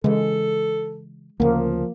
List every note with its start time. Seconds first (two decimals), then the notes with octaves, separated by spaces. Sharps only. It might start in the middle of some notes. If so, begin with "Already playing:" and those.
0.04 C#3 E3 G#3 A4
1.40 D2 C#3 F3 A#3